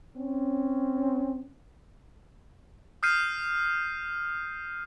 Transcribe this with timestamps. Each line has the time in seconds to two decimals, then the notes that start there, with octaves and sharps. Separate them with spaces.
0.16 C4 C#4
3.03 D#6 F6 G6 C7 D#7